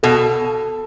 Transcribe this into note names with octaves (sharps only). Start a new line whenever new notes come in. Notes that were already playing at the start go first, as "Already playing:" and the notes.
B2 A4